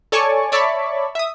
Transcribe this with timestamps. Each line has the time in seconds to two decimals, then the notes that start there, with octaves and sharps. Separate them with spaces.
0.12 A4 C#5 D5 G#5 A5 C#6
0.52 C#5 D5 E5 A5 B5 C#6
1.15 E5 D#6